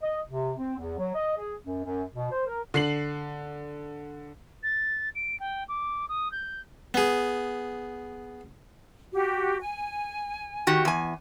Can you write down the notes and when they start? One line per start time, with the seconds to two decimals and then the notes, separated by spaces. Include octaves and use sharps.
0.01 D#5
0.27 C3
0.56 C4
0.77 E2
0.97 F#3
1.14 D#5
1.36 G#4
1.61 F#2
1.82 F#2
2.13 B2
2.31 C5
2.46 A#4
2.74 D3 C7 F#7
4.63 A6
5.15 D7
5.40 G5
5.68 D6
6.08 D#6
6.31 G6
6.94 B3 G#4
9.13 F#4 G4
9.60 G#5
10.67 D#3 F#4 G4
10.85 E2 G#5